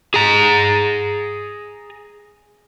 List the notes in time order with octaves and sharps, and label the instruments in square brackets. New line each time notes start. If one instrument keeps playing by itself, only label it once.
[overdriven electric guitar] G#4 A#5